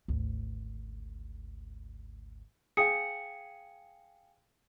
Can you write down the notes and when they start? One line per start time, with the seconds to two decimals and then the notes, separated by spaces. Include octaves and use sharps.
0.08 G#1 D2
2.77 G#4 F5 G5 C#7